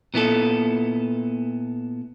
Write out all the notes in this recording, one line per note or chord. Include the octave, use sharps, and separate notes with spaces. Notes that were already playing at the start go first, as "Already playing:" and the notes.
A#2 B3 E4 A4